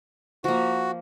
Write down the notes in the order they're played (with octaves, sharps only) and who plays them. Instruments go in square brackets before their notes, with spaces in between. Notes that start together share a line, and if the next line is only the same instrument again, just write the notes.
[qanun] F3 A#3 [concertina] F#4